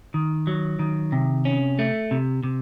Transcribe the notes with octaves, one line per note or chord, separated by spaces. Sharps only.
D#3
F#3
D#3
C3
C#4
A3
C3
C3